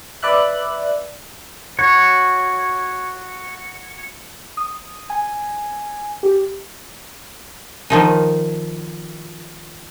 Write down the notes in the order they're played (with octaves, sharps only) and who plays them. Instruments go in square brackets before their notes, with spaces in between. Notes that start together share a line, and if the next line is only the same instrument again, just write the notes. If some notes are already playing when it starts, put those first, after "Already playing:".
[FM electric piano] B4 D5 E5 F#6
[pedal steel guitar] F#4 C#5
[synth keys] D#6
G#5
G4
[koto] D#3 F3 D#4